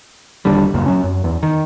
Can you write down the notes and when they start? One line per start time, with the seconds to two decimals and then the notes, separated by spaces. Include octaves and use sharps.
0.45 D#1 D#2 D3 G3
0.74 C#2 F#2 A#2
0.86 F#3 C#4
1.04 F#2
1.24 E2
1.43 D#3